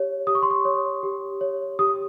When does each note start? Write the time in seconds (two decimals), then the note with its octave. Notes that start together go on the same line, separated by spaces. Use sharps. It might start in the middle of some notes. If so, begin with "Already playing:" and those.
Already playing: G4 C#5
0.27 G4 D#6
0.35 C#6
0.43 C6
0.51 C#6
0.65 C#5
1.03 G4
1.41 C#5
1.79 G4 D#6